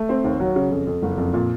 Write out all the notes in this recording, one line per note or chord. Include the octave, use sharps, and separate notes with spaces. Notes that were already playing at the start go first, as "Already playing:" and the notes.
Already playing: A3
C4
D#2
F#3
C#3
F2
F2
F#1
F2
A#2